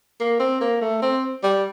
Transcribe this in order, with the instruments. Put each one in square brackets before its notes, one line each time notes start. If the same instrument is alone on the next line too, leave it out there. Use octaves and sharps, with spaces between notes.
[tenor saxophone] A#3
C4
A#3
A3
C4
G3